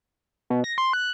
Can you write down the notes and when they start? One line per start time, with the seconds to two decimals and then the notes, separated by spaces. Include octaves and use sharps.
0.50 B2
0.64 A#6
0.78 C6
0.93 F#6